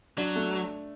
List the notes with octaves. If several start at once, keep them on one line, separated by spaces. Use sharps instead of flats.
F#3 D4
A3